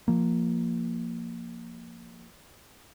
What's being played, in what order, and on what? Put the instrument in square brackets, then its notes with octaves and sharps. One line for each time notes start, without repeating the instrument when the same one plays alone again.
[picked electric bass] F3 A#3